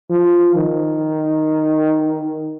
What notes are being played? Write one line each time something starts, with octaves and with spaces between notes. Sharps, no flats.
F3
D#3